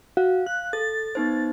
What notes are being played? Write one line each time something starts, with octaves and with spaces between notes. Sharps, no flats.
F#4 F5
F#6
A4 A6
B3 D#4 C5